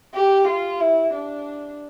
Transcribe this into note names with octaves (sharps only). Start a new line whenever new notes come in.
G4
F4
E4
D4